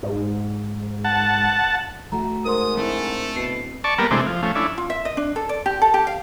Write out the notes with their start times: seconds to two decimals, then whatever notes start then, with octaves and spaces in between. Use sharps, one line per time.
0.03 G#2
1.04 F#5 A5
2.12 A3 F#4 A#5
2.45 G#2 A#4 C5 C6 D#6
2.77 A3 C4 D4 E4
3.36 B2 C7
3.84 D5 A5 C#6
3.98 G3 A#3 B3 A#4
4.11 C3 E3 G#3 A3 C4 D4
4.27 F3
4.43 F3 A3 C#4
4.56 C#4 D4 E4
4.78 F4
4.90 E5
5.05 D#5
5.17 D4
5.36 A4
5.49 D5
5.66 G4
5.82 A4
5.94 G4
6.07 F5